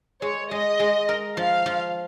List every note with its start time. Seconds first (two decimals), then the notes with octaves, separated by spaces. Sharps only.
0.22 G#3 C#5
0.51 G#3 D#5
0.80 G#3
1.09 A#4
1.37 F3 F5
1.66 F3